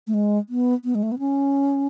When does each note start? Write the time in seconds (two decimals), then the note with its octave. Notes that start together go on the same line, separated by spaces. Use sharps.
0.07 A3
0.14 G#3
0.49 B3
0.85 B3
0.95 G#3
1.03 A3
1.12 B3
1.19 C#4